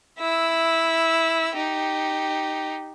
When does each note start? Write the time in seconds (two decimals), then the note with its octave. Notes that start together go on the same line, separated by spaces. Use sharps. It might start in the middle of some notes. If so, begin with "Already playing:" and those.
0.19 E4 E6
1.55 D#4 G4